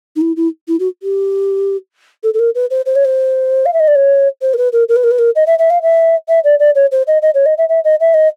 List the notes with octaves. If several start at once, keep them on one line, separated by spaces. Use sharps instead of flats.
D#4
E4
E4
E4
F#4
G4
A4
A4
A#4
B4
C5
C5
C#5
C5
F5
E5
D#5
D5
C#5
C5
A#4
B4
A#4
A#4
B4
A#4
B4
A#4
D#5
E5
E5
F5
E5
E5
D5
D5
C#5
C5
D#5
D#5
C#5
D#5
E5
E5
D#5
E5
D#5